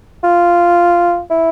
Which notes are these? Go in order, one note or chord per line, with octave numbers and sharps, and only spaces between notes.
F4
E4